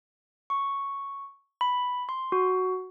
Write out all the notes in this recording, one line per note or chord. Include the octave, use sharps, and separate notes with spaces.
C#6
B5
C6
F#4